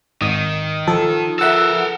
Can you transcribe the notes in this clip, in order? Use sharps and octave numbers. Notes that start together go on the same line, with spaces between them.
G#1 D#3 D#6
F3 A4
A4 A#4 E5 F#5 E6